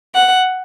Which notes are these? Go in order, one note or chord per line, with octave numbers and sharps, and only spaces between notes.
F#5